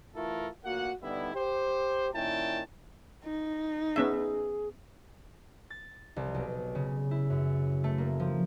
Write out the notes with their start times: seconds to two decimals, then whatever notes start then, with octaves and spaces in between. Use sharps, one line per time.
0.15 E3 A3 E4 F4 A4 A#4
0.65 D2 A#2 A#3 F#4 F#5
1.02 D3 G3 B3 D#4 E4
1.35 G4 C5
2.15 A#2 D#3 C#4 E4 G5 A5
3.24 D#4
3.96 B3 C#4 G#4 E5
5.70 A6
6.16 C2
6.35 B1
6.75 C#3
7.11 E4
7.30 F#2
7.84 A3
7.98 A#3
8.20 F3